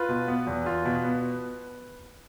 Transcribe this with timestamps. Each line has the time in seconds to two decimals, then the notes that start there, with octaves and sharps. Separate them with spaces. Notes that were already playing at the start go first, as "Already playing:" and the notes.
Already playing: F4 B4
0.09 B2
0.28 B3
0.47 E2
0.66 F4
0.85 B2
1.05 B3